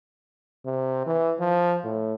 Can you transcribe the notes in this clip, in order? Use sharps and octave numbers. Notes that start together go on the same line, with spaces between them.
C3
E3
F3
A2